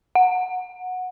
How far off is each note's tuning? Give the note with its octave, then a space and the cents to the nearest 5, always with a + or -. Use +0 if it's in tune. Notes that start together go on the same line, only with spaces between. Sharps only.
F#5 -15